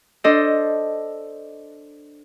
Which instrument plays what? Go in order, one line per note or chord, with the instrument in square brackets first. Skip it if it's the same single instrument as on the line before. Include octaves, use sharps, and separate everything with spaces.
[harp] D4 A4 C5 D#5